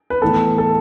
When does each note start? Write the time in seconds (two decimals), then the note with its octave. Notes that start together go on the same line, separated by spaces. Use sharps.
0.10 B4
0.21 A2 E3 B3 A4
0.58 A4